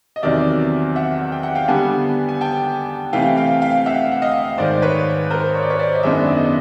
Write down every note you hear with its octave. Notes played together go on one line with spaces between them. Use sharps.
D#5
E2 C3 D#3 F#3 D5 E5
E5 F#5
G5
F#5
F5 G5
D3 G3 B3 D4 F#5 G#5
G#5
G5 A5
C3 E3 A3 F5 G5
F5 G5
F5 G5
E5 F#5
F#5
D#5 F5
G#2 D#3 G#3 C5 D5
B4 C#5
A#4 C5
C#5
D5
B4 C#5
C5 D5
D#5
F#2 D#3 G#3 B3 D4 D5 E5
D5 E5
D#5
E5